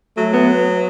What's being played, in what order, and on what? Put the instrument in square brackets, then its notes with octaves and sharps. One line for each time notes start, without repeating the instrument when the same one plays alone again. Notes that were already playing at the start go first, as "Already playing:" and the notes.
[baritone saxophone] F#3 [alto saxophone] A3
[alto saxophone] B3